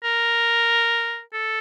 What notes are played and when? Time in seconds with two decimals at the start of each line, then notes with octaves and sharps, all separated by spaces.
0.04 A#4
1.34 A4